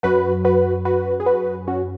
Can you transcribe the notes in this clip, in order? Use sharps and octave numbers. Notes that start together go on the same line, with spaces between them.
F#2 F#3 F#4 B4
F#4 B4
F#4 B4
G#4
F#4 B4
C#4 F#4